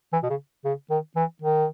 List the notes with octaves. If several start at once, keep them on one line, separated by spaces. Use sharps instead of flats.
E3
B2
C#3
C#3
D#3
E3
D#3